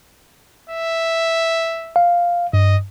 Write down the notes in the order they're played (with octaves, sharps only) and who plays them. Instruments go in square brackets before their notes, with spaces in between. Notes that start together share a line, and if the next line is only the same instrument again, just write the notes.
[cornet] E5
[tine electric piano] F5
[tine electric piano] G2 [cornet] D#5